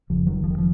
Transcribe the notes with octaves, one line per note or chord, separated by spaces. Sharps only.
F1 F2 C#3 F3
D#3 F#3
F3
D#3
F3